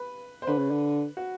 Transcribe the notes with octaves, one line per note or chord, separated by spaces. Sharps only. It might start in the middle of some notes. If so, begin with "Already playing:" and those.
Already playing: B4
C5
D3 B4
C#3
D3
F#4